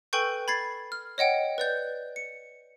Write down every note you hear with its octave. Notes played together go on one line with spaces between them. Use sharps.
A4 B4 G5 G#5 C#6 G6
B5 G#6 A6 C7
F6
C#5 D#5 F#5 G5
B4 D5 G6
C#7